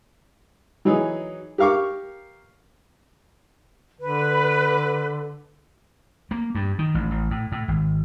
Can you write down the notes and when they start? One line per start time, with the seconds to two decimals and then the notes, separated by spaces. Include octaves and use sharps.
0.85 E3 F#3 D#4 G#4
1.58 G4 A#4 F5 C#6 D6
4.00 D3 B4
6.31 A#3
6.55 G2
6.79 D#3
6.94 A1
7.11 A1
7.31 A2
7.52 A2
7.68 G#1